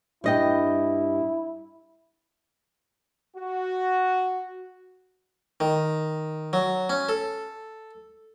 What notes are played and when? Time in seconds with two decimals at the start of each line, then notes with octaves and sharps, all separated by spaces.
0.24 G2 E4 D#5 G5
3.36 F#4
5.60 D#3
6.53 F#3
6.90 C#4
7.09 A4